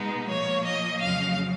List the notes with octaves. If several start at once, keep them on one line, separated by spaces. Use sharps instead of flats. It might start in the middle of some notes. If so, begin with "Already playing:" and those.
Already playing: B2 G#3 B3 D#4
A#2 F3 A#3 C#5
D#5
F2 C#3 F#3 F5